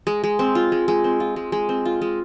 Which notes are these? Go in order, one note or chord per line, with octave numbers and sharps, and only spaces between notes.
G#3
G#3
C4
F4
G#3
G#3
C4
F4
G#3
G#3
C4
F4
G#3